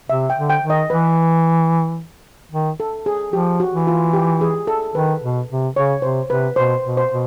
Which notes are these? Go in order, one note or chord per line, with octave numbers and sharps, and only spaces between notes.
C3 E5
G5
D3
G5
D#3
D#5
E3 B4
D#3
A4
G#4
F3 G4
F#4
E3
F4
G4
G#4
A4
D#3 B4
B2
C3
C#3 C#5
C3 C5
C3 B4
B2 C5
B2
C5
B2